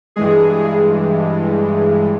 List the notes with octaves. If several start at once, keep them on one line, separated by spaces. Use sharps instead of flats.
G2 E3 G#3 G#4